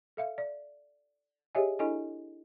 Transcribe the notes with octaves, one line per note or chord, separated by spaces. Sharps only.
A4 E5 F5
D5
G4 G#4 C#5 D#5 E5 G#5
D4 E4 A4 D#5 G#5